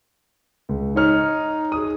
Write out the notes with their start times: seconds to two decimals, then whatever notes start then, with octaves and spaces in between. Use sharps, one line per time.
0.69 C#2
0.96 D#4 C#5 F6
1.72 G#4 D#6